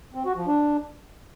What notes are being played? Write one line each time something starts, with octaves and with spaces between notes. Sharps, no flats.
C4
F#4
F3
D4